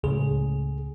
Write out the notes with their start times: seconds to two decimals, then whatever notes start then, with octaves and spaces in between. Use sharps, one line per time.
0.04 C#2 A2 G#4